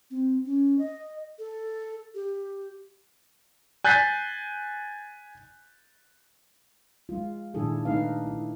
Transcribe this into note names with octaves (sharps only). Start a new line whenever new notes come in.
C4
C#4
D#5
A4
G4
G#5 F#6 G6 A6 B6 C7
G#3 F4
A#2 D#3 D4 E4 G#4 A4
A3 D4 D#4 B4 F5
E4